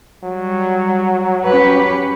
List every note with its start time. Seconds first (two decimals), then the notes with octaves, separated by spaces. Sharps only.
0.23 F#3 G3
1.47 C#4 G4 B4